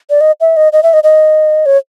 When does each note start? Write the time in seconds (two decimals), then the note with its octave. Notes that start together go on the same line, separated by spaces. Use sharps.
0.10 D5
0.21 D#5
0.41 E5
0.57 D#5
0.73 D#5
0.83 E5
0.93 D#5
1.04 D#5
1.66 C#5